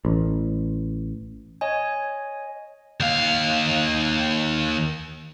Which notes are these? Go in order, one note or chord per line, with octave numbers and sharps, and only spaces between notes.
A1
C#5 D#5 G#5
D#2 F5